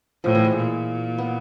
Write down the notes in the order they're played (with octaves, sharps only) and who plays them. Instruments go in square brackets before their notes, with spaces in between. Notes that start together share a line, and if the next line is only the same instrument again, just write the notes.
[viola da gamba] A2 [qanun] F3
[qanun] E3
G#3
[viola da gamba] A#2
[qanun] B3